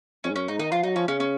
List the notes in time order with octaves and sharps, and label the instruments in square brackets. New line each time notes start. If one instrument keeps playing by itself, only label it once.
[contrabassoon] F2 [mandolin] C#4
[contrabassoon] G#2
[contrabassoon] F#2 [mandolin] C#4
[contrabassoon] G#2 [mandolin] D#4
[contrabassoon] D#3 [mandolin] D#4
[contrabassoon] F3 [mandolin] F4
[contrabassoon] F#3 [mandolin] D#4
[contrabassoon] F3 [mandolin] C#4
[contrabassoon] C#3 [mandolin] C#4
[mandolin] C#4